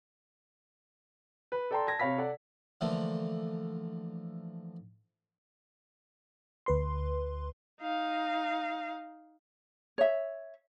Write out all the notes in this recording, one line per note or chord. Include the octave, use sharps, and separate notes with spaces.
B4
A4 D5 G5 A5 A#5 C6
A5 G#6 A#6
C3 C#5 F5 B5 B6
A4 D5 F#5
D3 E3 F3 A3 A#3
D2 B4 C6
D#4 F5
C#5 E5